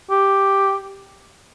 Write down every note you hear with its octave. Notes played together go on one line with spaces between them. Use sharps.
G4